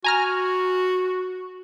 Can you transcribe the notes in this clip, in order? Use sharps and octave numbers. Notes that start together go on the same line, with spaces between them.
F#4 G#5 A#5 F6